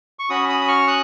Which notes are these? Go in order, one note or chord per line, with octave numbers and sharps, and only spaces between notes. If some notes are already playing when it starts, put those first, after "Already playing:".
C#6
C#4 F#4 B5 D#6
B5 D#6
D#6
C#6 F6
D#6 F#6